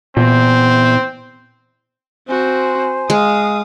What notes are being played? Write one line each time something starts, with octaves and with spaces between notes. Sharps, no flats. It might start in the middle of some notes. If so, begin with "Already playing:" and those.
E2 A#2 C4
C4 F#4 C5 G#5 C6
G#3 F5 D#6